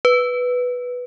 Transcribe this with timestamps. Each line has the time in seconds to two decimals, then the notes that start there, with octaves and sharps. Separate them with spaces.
0.05 B4